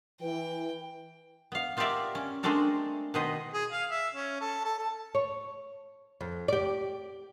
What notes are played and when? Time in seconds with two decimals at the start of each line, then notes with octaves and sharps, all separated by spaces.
0.21 E3 B4 G5
1.52 B3 F5
1.77 B3 F4 G4 A#4 D5 E5
2.15 C#4
2.43 G#3 A3 C4 D4 A4 A#4
3.14 B2 D#3 B3 B4 C5 D#5
3.54 G#4
3.72 F5
3.91 E5
4.15 C#4
4.41 A4
4.64 A4
4.79 A4
5.15 C#5
6.21 F2
6.48 G4 D5